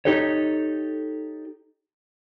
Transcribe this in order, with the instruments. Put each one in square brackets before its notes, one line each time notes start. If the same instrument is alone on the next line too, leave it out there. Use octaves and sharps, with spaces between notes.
[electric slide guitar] D#4 G4 A4 C#5